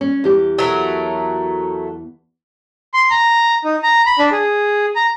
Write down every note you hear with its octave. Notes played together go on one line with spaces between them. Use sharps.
C#4
E2 G4
F#3 A3 A#4
C6
A#5
D#4
A#5
B5
D4
G#4
A#5